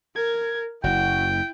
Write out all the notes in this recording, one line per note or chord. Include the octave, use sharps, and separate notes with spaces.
A#4 G#6
F#1 E4 F#4 G5